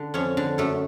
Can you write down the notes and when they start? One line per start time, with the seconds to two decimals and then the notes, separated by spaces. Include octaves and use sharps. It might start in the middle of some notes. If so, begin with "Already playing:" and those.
Already playing: D3
0.14 F2 C#4 C#5
0.37 D3
0.58 F#2 A3 A4